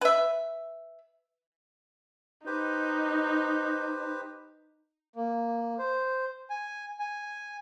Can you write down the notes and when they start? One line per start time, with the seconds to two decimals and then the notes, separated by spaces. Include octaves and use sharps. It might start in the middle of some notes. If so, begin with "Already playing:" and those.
0.01 B4 E5
2.46 D#4 G4 B4 C5
5.16 A#3
5.79 C5
6.50 G#5
6.99 G#5